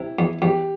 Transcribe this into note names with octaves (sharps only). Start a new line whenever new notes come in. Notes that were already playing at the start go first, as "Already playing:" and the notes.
Already playing: C3 E4
E2
E2 G4